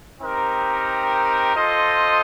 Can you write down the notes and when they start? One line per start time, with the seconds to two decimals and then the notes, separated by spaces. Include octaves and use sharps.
0.21 C4 D#4 G4 A#4
1.55 F4 A4 C5 D#5